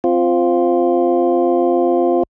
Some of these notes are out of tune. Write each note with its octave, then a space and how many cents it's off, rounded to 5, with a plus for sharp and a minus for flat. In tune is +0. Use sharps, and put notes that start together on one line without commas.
C4 +0 F4 +0